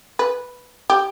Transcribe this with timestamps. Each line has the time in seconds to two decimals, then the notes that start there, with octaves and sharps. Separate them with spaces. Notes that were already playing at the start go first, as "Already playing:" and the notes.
0.19 B4
0.90 G4